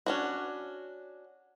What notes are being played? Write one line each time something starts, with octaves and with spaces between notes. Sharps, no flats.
C#4 D4 F#4